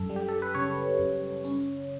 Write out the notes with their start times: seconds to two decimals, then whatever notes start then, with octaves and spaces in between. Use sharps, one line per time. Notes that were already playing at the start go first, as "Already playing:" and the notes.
Already playing: F#2 A4
0.10 G3
0.16 G4
0.28 A4
0.42 B4
0.55 C#3 C#5
0.99 F#2
1.45 C#4